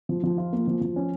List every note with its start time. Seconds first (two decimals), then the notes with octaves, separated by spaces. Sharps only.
0.09 F3
0.23 F3
0.38 F4
0.53 A#3
0.67 F3
0.81 F3
0.96 C#4